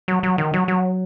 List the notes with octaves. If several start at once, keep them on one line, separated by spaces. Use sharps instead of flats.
F#3
F#3
D#3
F#3
F#3